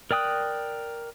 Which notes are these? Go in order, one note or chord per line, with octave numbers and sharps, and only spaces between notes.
A#4 D5 G5 D#6 F#6